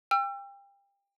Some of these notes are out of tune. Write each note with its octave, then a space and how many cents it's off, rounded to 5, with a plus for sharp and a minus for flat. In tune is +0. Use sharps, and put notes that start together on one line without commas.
G5 +30 E6 +35